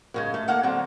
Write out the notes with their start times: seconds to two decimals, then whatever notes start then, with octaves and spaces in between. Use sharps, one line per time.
0.14 F#2 C#3 G#3
0.34 A3
0.48 A#3 A4 F5 F#5
0.63 D3 F#3 C4